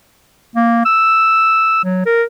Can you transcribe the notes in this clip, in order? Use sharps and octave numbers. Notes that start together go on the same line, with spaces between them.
A#3
E6
F#3
A#4